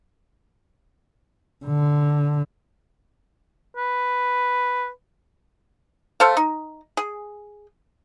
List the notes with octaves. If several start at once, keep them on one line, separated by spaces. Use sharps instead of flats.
D3
B4
A3 A4 C5 F5
D#4
G#4